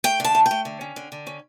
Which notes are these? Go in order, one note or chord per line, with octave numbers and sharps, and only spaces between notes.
A3 G5
D3 A5
A3
G5
A3
D3
C#4
D3
D3
C#4